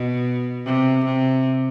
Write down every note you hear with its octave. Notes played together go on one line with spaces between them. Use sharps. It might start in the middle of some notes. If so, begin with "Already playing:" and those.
Already playing: B2
C3
C3